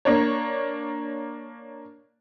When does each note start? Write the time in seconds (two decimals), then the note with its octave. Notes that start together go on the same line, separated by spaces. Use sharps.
0.05 A#3 D4 C#5